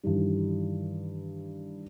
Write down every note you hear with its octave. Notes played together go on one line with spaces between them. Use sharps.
G2 D#3 E3 G3